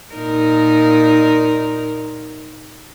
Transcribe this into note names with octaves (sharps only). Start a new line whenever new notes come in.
A#2 D#4 A#4